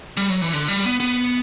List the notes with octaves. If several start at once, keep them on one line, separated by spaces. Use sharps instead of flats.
G3
F#3
E3
D3
G3
B3
B3